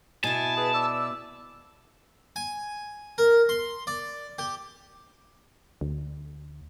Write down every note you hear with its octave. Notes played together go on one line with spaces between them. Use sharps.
B2 E4 G#5 A5
G#4 B4
D5 E6
G#5
A#4
C6
D5
G4
D2